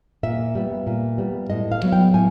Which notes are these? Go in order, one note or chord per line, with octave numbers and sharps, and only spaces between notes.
A#2 E5
G3 B3
A#2
G3 B3
A2 D#5
F5
F#3 B3
G5
A2 G#5